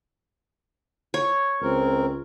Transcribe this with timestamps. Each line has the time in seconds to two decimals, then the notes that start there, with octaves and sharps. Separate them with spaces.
1.14 C#5
1.62 C#2 C4 A#4